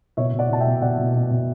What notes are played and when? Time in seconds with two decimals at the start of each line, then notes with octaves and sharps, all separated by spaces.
0.17 B2 C#5 E5
0.33 B2
0.39 D5 F#5
0.50 B2 A5
0.61 E5 G5
0.66 B2
0.82 B2 D5 F#5
0.98 B2
1.14 B2
1.31 B2